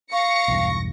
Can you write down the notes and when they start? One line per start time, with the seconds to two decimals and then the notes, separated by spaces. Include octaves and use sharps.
0.12 F5 C#6 A#6 C#7
0.48 B1 E2 G2